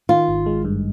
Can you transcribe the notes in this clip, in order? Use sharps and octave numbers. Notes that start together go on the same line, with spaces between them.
D#3 F4
G#1
G#3
G2